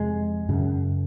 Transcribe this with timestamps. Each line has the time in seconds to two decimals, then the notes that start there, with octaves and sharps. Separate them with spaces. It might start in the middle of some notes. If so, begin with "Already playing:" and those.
Already playing: F2 C3 G#3
0.49 F#2 C#3